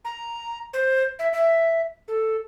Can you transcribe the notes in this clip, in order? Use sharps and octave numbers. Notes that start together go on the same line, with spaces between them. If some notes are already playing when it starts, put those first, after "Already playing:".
A#5
C5
E5
E5
A4